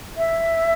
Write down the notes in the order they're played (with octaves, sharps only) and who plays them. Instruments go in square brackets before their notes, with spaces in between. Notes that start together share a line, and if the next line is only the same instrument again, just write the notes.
[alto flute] E5